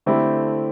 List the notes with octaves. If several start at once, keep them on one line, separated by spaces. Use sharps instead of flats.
D3 A3 C4 E4 G4